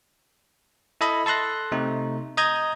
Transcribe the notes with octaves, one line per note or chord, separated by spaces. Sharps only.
E4 A4 D#5 B5
A4 A5 C6 F#6 A#6
C3 A3 D#4
D#5 A#5 D#6 G6 G#6 A#6